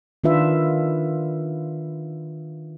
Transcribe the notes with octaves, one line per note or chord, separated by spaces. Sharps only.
D#3 D4 F4 B4 E5